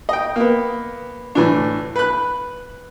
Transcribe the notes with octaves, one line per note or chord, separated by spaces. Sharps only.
D#5 G5
A#3 B3
A2 E3 D4
B4 F#6